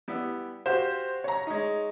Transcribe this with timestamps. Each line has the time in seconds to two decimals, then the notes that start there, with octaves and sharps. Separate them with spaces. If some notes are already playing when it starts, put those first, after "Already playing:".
0.08 G3 B3 E4
0.66 F#4 G4 C5 F5
1.24 C#5 A#5
1.47 G#3 D#4